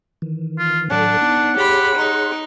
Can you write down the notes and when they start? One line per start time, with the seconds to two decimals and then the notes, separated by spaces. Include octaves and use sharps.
0.22 D#3 E3
0.59 F4
0.91 A2 F#3 D4 A4 F#5
1.22 B3 D#4
1.57 G4 G#4 C#5 B5 C6
1.95 D#4